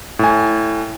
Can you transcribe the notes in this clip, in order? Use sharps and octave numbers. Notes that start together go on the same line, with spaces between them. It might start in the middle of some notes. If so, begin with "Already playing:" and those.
A2 G#5